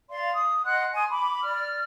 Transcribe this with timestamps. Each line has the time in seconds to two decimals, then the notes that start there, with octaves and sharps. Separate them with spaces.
0.10 D5 F5 C6
0.33 D#6
0.65 D#5 F#5 C6 F#6
0.94 G#5 C6 D#6
1.10 B5 D6
1.42 D5 F6